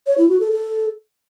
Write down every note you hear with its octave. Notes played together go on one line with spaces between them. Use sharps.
C#5
E4
F#4
A4
A4